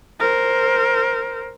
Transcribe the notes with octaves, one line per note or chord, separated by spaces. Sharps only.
A#4 C5